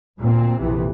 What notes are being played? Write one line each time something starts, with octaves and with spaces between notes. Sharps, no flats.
D2 A#2 C4
A#1 F2 C3 E3